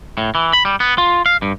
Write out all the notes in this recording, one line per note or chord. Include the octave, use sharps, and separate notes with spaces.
A2
E3
B5
G3
B3
F4
F5
G2